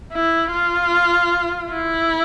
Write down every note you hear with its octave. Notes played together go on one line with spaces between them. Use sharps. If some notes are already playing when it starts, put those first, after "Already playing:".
E4
F4
E4